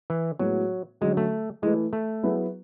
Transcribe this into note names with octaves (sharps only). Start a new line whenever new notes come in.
E3
A2 F#3 G#3 B3 F#4
D3 F#3 G#3 C#4 F#4
A3
E3 G#3 A3 E4 B4
A3
F#3 B3 E4 G#4 B4